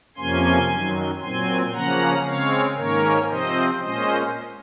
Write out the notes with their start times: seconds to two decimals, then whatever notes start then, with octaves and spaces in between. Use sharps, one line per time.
0.17 F2 C3 F3 A#3 C#4 G#5 C6
0.70 F#2 D#3 F#3
1.21 A#2 F#3 C4 G#5 C6
1.73 C#3 F3 A#3 C#4 F#5 A#5
2.25 C#3 G#3 C4 C#5 F5
2.76 G#2 D#3 A#3 C#4 A#4 C#5
3.29 C3 F3 C4 C5 D#5
3.81 A#2 G#3 C#4 C5 D#5